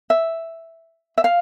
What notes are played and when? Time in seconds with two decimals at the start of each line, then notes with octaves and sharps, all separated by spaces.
0.10 E5
1.18 E5
1.24 F5